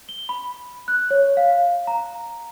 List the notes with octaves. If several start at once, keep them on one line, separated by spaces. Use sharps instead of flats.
G7
B5
F#6
C#5
F5
A#5